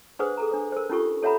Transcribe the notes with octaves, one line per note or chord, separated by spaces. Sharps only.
D4 G#4 B4 C5 F#5 D#6
G#4 A4 A#5
D4 C5
A#4 C5
C#4 D#4 F4 G4 A4 C#6
A4 C#5 E5 F#5 A#5 B5